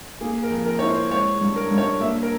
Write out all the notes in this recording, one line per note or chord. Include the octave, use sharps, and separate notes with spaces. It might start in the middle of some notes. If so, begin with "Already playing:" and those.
A#3 G#4
A#4
F2
A#4
E4 C#5
C5
G#3 C#5
G2
A#4
G2
C#5
A#3 E5
A#4